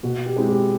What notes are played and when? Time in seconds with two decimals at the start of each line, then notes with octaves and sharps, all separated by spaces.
0.03 B2 F#4
0.26 G4
0.36 G#3 C4 E4
0.48 G4